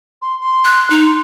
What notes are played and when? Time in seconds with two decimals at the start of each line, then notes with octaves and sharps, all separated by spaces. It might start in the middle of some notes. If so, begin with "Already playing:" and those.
0.22 C6
0.40 C6
0.65 F#6
0.90 D#4
1.06 C6